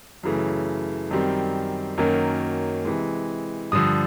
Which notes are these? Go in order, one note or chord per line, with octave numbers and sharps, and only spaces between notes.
F#2 C#3 E3 A3
F#2 D#3 G3 C4
F#2 D#3 F#3 A#3 C#4
C3 E3 G#3
G2 D3 F3 D#6